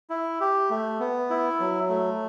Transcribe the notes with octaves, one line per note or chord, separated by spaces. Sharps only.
E4
G4
A3
B3
E4
F#3
A3